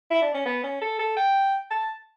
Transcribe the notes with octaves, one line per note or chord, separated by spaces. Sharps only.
E4
D4
C#4
B3
C#4
A4
A4
G5
A5